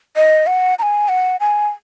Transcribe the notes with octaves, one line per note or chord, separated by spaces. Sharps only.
D#5
F#5
A#5
G#5
F#5
G#5